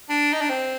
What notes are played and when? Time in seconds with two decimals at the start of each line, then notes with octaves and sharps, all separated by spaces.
0.09 D4
0.34 D#4
0.41 D4
0.49 C4